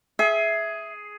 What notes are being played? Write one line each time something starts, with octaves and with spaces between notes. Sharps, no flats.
G#4 E5